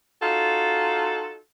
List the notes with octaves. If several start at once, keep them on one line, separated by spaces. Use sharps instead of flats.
D#4 F4 F#4 A4